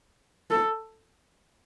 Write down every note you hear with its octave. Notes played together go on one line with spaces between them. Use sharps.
A4